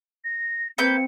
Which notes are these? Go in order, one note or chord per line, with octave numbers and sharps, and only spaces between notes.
A#6
A#3 C4 B4 G6 C#7